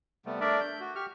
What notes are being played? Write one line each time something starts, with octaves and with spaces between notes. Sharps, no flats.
C3 G3 A3 B3
A3 D4 A#4 D5 E5
G6
F#4
G4 C#6 F6